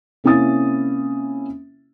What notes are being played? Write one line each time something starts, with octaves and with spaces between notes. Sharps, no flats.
C3 A#3 C#4 E4 D#6 A6